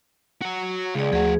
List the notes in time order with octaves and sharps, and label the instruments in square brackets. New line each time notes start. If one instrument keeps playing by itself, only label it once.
[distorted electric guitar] F#4 C#5
[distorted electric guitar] C#2 [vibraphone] G#4 D5
[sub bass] D2 [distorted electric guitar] F3 F#5 [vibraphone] G#4